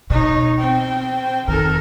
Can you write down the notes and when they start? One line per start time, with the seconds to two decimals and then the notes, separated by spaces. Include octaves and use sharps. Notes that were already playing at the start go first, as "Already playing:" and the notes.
0.10 B2 D#4 C#5
0.58 C4 G5
1.48 F2 D#3 A4 A#4